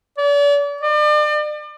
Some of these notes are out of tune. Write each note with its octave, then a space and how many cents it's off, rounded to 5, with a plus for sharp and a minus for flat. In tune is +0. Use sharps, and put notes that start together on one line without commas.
D5 -40
D5 +40